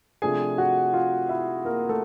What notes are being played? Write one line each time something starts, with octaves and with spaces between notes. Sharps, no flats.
C3 F3 A3 D4 G#4 G#5
F#4 F#5
F4 F5
E4 E5
A#3 A#4
A3 A4